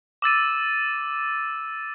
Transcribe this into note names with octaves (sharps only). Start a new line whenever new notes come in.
D6 E6 A6 D#7